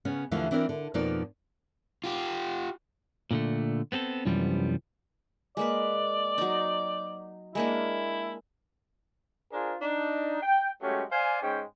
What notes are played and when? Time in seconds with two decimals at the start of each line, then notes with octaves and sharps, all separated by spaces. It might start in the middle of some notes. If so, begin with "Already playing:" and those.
0.05 C#3 B3 C#4
0.31 D#2 D3 E3 F3 A3 F5
0.51 E3 C4 D4 E4 A#4
0.69 D3
0.94 F2 B2 F3 A#3 D#4 D5
2.04 F4 G4
3.31 A#2 D3 A3
3.92 B3 C4 G#4 A4
4.25 C2 F#2 E3 F3 G3 B3
5.57 G#3 A#3 B4 D5
6.38 F#3 D#4
7.55 G#3 A#3 D4 E4
9.53 D4 F4 G#4 A#4 C5
9.82 D4 D#4
10.43 G5
10.82 F#3 G#3 A3 C#4 G4
11.12 C5 D5 F5 G#5
11.43 G#2 G#3 C#4 G5